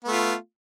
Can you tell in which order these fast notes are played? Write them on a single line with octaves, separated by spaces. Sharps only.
B3 A3 F4